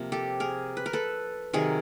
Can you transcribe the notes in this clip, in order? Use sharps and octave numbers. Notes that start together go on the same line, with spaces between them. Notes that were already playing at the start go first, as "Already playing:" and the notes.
Already playing: C3 F3 A#3
G4 A4
G#4 A#4
B4
A#4
A4 B4
C3 D#3 F#3 G#4 A#4